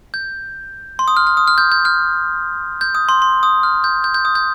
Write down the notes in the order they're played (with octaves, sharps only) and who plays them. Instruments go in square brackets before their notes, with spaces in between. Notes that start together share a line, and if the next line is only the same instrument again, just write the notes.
[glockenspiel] G6
C6
D#6
F6
F6
D#6
F6
G6
G6
F6
G6
D#6
C6
C6
D#6
F6
G6
G6
G6
D#6
G6